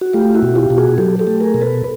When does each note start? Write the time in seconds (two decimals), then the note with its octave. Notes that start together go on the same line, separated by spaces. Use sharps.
0.01 F#4
0.13 A3 F4 G4
0.35 E4 F#4
0.43 B2
0.55 F4 G4
0.70 B2
0.78 F#4 G#4
0.98 F#3 G4 A4
1.19 G4 A4
1.27 A3
1.40 G#4 A#4
1.54 B2
1.61 A4 B4